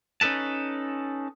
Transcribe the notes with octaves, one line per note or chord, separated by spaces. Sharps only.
C#4 D#4 A4 B4 A5